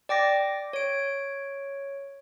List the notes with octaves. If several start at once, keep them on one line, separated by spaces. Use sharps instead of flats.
D5 G5 D6 A#6
C#5 D7